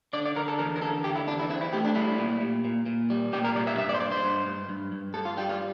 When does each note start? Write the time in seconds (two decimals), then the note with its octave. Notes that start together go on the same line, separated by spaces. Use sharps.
0.13 D3 D5
0.26 D5
0.36 D3 A#4
0.48 A4
0.59 E2 A#4
0.76 A#4
0.82 D3 A4
1.04 D3 G4
1.16 E4
1.27 E2 D4
1.39 E4
1.50 C4 E4
1.61 E4
1.73 A3 G4
1.85 D4
1.95 G3 E4
2.18 A#2
2.41 A#2
2.65 A#2
2.86 A#2
3.10 G3
3.33 A#2 G4
3.44 A#4
3.56 C2 D5
3.67 E5
3.77 G2 E5
3.89 D5
3.94 C5
4.00 G2 D5
4.11 C5
4.24 G2
4.46 G2
4.69 G2
4.92 G2
5.14 G2 A4
5.25 F4
5.37 G3 G4
5.49 F4